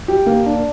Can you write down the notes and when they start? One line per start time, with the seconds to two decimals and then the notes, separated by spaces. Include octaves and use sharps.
0.08 G4
0.27 A#3
0.46 D4